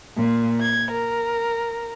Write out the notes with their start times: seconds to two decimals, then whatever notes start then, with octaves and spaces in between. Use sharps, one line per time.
0.16 A#2
0.61 G#6
0.91 A#4